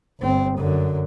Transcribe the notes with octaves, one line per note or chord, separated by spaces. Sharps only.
G1 C4
F#2 D3